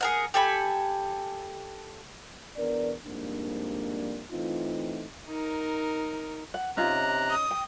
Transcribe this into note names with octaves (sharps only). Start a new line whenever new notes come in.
G#4 A#4 F#5
G4 A4 G#5 B5
E2 B3 D4 A#4 D5
F2 G#2 G3 A#3 D4
E3 A3 C4 D#4 F4
D#4 A#4
F#5
C3 C#4 D#4 F4 A#5 F#6
D#6
G5